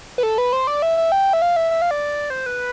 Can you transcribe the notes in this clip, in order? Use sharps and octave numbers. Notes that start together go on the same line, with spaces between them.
B4
A4
B4
C5
D5
E5
E5
G5
E5
F5
E5
E5
F5
D5
C5
B4